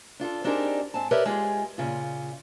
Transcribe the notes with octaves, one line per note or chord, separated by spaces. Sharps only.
D4 F4 G#4 A4
C4 D4 D#4 G4 G#4 A#4
G#2 C4 G#5 A5
G4 A#4 B4 C#5 D5 E5
G#3 F4 G4 G#4
A#2 C#3 F4